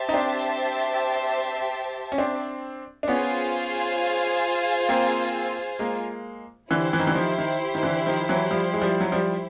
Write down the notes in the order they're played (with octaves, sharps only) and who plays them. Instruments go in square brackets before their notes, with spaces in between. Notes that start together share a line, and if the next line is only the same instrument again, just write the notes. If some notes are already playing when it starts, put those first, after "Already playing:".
Already playing: [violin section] G4 C5 E5 A5
[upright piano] D#4
C4 D4
C#4
C4 D4
D4
[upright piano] B3 C#4 [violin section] F4 G#4 C5 F5 G#5
[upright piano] A#3 C4
G#3 A#3
[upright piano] D3 E3 [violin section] E4 G4 C5
[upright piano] E3
D#3
D3 E3
D#3 F3
D#3
D#3
D3 E3
D#3 F3
E3 F#3
F3 G3
G#3
F3 G3
F#3
F3 G3